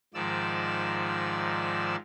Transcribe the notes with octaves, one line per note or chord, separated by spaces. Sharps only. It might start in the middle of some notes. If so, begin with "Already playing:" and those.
G#2 D#3 F3 D5 E6